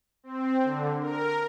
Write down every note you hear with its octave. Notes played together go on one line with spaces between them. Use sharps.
C4
D3
A#4